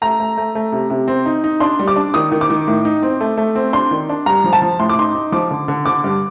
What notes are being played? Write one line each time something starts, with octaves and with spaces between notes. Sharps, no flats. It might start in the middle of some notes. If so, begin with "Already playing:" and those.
A3 A#5
A3
A3
A3
C3
C3
C4
D#4
D#4
D4 C6
G3
D6
D4
D#3 D#6
D#3
D6
D#3
A2
D#4
C4
A3
A3
C4
D4 C6
D#3
D4
G2 A#5
F3
A5
F3
A2 C6
D6
D#4 C6
D#4
F3 D6
D3
D3
D3 D6
G2